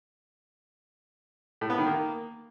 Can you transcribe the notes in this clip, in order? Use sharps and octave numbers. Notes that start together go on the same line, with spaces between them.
A2
B3
D#3
A#3